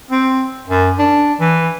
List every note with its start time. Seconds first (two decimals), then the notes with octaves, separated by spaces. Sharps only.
0.11 C4
0.68 F#2
0.98 D4
1.40 E3